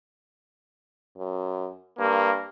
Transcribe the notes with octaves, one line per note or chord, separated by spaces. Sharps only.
F#2
G2 A#3